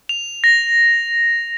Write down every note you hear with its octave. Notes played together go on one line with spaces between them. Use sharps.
F7
A#6